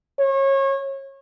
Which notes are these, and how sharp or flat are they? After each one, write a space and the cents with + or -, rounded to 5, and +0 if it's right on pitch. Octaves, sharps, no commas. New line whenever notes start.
C#5 -30